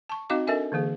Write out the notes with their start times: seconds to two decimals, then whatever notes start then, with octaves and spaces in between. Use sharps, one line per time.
0.09 A5 C#6
0.30 C4 D#4 F#4 D#5 F5 D6
0.47 D4 A4 A#4 D#5 E5 G#5
0.72 D3 E3 A#3 G#4